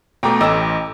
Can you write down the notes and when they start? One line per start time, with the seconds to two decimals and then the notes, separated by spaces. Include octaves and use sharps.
0.23 B2 A3 G5 A#5 D6
0.41 A1 A4 D#5 E6